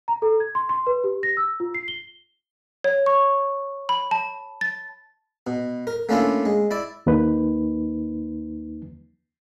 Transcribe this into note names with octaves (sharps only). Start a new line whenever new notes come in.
A#5
A4
G#6
C6
C6
B4
G4
A#6
E6
F4
C7
G7
C#5
C#6
B5
A5
A6
B2
A#4
A3 A#3 C#4 D4 E4 F4
G#3
E4 D5 D6
D#2 A#3 D#4 B4